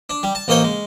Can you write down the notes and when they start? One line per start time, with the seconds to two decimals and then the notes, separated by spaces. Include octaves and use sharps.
0.10 D4
0.23 G3
0.35 A5
0.48 A1 A#3 D#4 C5 C#5
0.64 G#3